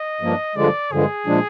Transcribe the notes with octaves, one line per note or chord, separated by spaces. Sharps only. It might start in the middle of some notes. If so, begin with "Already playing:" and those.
Already playing: D#5
G2 F3 A#3 D4
G2 D3 F3 G#3 D5
G2 D3 F3 G#3 G#4
A#2 F3 G#3 D4